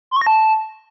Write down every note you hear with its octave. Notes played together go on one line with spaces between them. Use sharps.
C6
C#6
A#6
A5